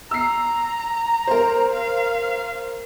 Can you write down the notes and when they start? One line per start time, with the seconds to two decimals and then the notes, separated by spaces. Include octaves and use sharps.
0.11 A#5 E6 C7
1.27 A#4 C5
1.72 F5